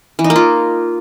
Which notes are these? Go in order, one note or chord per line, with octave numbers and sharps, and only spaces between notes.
E3
D#4
A#3
F4